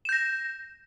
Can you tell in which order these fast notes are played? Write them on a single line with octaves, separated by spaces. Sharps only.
E7 G6 A#6